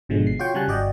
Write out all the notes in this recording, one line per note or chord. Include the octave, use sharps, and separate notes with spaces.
G#1 B2 D3 F3 G#3
C7
F4 F#4 C#5 G5 C#6
C#3 G3 G#5 A5 F#6
G1 F#4 D5 D#5 G5